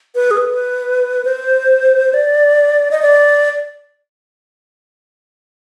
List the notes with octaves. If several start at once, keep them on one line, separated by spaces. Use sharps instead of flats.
B4
G#4
B4
C5
D5
D#5
D5